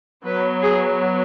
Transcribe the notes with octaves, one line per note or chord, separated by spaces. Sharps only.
F#3 B3 B4
G#4